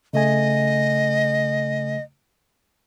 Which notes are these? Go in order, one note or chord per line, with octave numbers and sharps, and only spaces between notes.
C#3 A3 D#5 G#5